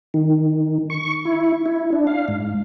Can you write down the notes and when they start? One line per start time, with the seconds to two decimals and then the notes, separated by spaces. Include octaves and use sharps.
0.14 D#3
0.90 C#6
1.25 E4
1.66 E4
1.93 D4
2.07 F5
2.28 G#2